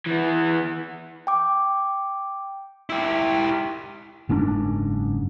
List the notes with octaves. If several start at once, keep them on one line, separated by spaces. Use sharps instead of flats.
E3 B3
G5 D6
E4 G4
F#1 G#2 C#4 D4